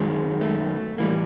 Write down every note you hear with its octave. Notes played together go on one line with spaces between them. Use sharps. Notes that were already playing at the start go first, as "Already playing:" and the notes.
Already playing: F#2 D#3 F#3 G#3
A3
A2 E3 G3 A#3